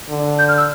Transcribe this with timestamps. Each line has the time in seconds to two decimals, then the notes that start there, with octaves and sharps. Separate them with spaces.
0.09 D3
0.39 G6
0.48 F6
0.57 E6